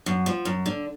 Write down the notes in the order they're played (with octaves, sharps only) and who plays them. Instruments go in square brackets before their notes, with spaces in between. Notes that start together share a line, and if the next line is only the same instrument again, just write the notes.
[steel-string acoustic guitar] F#2
F3
F#2
D3